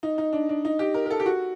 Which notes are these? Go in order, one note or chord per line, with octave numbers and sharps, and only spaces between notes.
D#4
D#4
D4
D4
D#4
G4
A#4
A#4
A4
G4
F#4